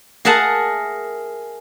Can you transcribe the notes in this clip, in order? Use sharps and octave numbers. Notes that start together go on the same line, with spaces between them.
G#4 A#4 E5 F#5 A5 A#5